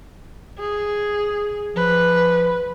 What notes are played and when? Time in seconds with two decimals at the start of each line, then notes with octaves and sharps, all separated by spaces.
0.59 G#4
1.76 F3 B4